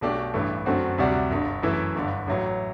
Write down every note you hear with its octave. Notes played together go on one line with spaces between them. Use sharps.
B1 B2 A3 D4 G4
A1 G2 E3 A3
F#2 D3 A3 C4 F#4
D2 C3 G3 D4 F#4
G1 G2 D3
F#2 E3 A3 E4
G1 G2 D3
A1 A2 F#3